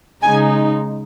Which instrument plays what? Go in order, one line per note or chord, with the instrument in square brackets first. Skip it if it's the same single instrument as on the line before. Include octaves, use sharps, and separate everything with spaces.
[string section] C#3 G#3 D#4 G#5